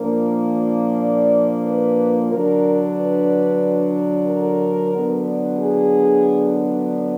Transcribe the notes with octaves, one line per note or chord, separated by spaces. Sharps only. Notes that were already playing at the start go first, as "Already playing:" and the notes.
Already playing: A#2 F3 A#3 D4 A#4
D5
B4
D3 F#3 D4 A#4
B4
A#4
D3 F#3 B3 D4
G#4